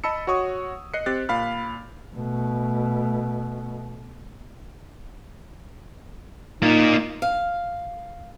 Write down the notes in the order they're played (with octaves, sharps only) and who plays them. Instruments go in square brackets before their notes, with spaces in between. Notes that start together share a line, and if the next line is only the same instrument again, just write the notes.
[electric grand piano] D#5 A5 B5 E6 C#7
F#4 C#5 C#6 D#6
D#5 F#6 C7 C#7
C4 G4 F#6 A6
A#2 F5 B5 F6
[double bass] B2 A3
[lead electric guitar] A#3 F4 [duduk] D#4
[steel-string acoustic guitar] F5